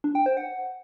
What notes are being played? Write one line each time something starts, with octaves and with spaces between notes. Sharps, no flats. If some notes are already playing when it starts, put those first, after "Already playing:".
D4
G5
C5
F#5